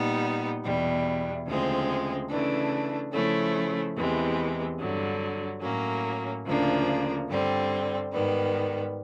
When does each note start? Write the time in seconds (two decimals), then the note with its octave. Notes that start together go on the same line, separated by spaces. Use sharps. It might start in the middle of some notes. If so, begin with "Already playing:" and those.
Already playing: A#2 G3 B3 D#4
0.63 E2 B2 G3
1.45 D2 C#3 F3 G#3 C4
2.29 C#3 E3 A3 D4
3.12 C#3 F3 A3 C#4 E4
3.96 E2 C3 E3 G#3
4.79 G2 D3 F#3
5.62 A2 F#3 A#3 C#4
6.45 D2 C#3 F3 A#3 D4
7.28 G2 D3 G3 C4
8.11 G#2 D#3 G3 B3